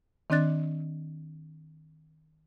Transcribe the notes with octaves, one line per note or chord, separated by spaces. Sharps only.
D#3 C4 D4 D5 F#6 A6